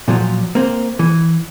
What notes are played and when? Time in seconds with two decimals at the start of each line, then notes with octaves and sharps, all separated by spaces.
0.08 A#2 F3 F#3
0.55 A#3 C4
0.99 E3